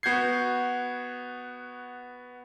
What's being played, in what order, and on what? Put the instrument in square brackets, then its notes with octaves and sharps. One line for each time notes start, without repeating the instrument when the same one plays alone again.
[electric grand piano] B3 F#4 G6 G#6 C7